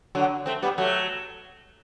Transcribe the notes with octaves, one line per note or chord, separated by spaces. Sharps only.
D3 F#3
A3 C4
G3 B3
F#3 A3